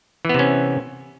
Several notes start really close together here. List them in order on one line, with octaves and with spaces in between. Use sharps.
E3 B3 C3 C#4